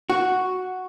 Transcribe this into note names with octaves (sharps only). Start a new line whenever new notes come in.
F#4